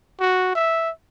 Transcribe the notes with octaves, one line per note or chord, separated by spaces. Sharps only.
F#4
E5